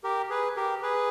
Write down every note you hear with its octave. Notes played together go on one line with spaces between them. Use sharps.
G4 A#4
G#4 B4
G4 A#4
G#4 B4